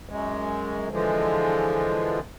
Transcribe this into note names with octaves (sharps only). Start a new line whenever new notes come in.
F#2 G#3
D3 E3 F3 G#3